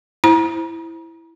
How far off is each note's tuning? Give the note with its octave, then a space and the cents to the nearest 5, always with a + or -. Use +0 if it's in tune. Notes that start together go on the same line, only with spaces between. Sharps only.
E4 +0 C5 +0 A#5 +35